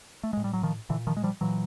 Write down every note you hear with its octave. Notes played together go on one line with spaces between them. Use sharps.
A3
A2 G#3
G3
F#3
D#3 F3
A#2 D3 E3
D#3 F3
G#3
F3 G3
A#2 E3 F#3